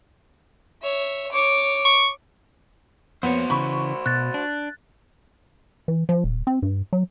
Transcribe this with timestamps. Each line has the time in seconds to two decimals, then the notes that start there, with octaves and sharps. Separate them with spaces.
0.82 C#5 E5
1.32 C#5 D6
1.85 C#6
3.23 F2 A#3 B3 F#4 C5 C#5
3.50 C#3 E3 B5 C#6
4.06 B2 F#6 A6
4.34 D4
5.88 E3
6.09 F3
6.24 D#1
6.47 C4
6.62 G2
6.93 F#3